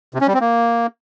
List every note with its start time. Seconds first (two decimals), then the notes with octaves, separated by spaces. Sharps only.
0.14 C3
0.21 C#4
0.27 G3
0.34 C4
0.41 A#3